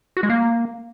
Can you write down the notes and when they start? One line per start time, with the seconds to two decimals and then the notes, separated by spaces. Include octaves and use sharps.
0.17 F#4
0.23 G#3
0.30 A#3